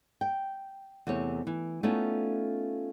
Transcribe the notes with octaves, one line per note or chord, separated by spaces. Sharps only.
G5
E2 C3 A3 C#5
E3
A3 B3 C#4 D#4 F4 A4